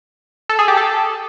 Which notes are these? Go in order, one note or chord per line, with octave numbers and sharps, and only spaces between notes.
A4
G#4
G4
A4